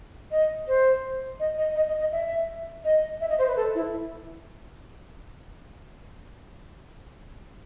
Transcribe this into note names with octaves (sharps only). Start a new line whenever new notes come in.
D#5
C5
D#5
D#5
D#5
D#5
D#5
E5
D#5
E5
D#5
C5
B4
A4
E4